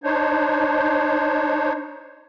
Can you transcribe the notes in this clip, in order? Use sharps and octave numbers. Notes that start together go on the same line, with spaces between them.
D4 D#4 C5 C#5